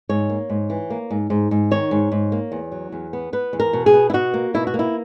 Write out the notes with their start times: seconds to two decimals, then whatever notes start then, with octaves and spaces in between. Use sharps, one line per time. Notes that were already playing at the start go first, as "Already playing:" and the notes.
0.09 G#2 C#5
0.30 A#3
0.50 G#2
0.70 E3
0.90 A#3
1.10 G#2
1.30 G#2
1.51 G#2
1.71 D#3 C#5
1.91 G#2
2.12 G#2
2.32 A#3
2.52 E2
2.72 F#3
2.92 E2
3.13 B3
3.33 B3 B4
3.53 E2
3.60 A#4
3.73 B2
3.86 G#4
3.94 B3
4.10 E4
4.13 B2 F#4
4.34 A#3
4.54 B2 E4
4.67 F#4
4.74 A#3
4.79 E4